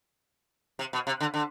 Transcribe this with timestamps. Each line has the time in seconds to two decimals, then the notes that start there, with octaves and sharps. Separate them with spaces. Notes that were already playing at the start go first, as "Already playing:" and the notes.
0.79 C3
0.93 B2
1.07 C3
1.20 D3
1.34 D3